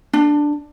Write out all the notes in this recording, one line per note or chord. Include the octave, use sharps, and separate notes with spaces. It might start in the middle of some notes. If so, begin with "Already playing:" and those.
D4